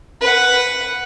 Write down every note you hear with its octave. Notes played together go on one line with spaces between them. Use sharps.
B4 F#5